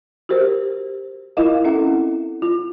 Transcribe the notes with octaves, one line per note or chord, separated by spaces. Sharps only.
F#4 G4 A#4 C5
E4 F4 A#4 D#5 F5
C4 C#4 E4 A4 E5 F#5
F4